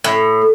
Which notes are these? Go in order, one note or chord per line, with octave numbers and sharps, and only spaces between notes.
A2